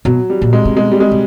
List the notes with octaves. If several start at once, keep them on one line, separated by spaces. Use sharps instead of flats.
B2 F#3
G3
A#2
G#3
C3
B2 G#3
G3
G#3
C3